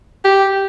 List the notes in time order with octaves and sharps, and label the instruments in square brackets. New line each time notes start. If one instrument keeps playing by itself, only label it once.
[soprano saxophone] G4